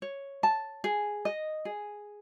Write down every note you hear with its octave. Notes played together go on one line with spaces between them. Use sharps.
C#5
A5
G#4
D#5
G#4